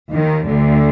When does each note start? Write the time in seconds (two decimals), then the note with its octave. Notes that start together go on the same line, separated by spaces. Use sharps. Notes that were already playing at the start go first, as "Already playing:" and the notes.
0.13 D#2 D#3
0.48 D2 D3